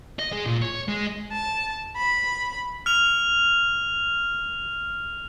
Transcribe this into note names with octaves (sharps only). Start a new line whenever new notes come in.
D#5
G#3
A#2
C#5
G#3
A5
B5
F6 F7